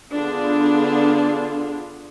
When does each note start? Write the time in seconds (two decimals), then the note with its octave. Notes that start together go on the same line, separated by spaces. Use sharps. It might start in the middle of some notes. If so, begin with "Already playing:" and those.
0.13 D3 B3 D4 F4 G#4